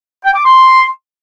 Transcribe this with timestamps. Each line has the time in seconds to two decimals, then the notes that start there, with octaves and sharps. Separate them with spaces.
0.24 G5
0.35 D6
0.45 C6